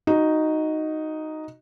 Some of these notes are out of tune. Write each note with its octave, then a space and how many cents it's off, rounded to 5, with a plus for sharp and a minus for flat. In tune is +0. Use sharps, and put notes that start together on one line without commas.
D#4 +0 F#4 +0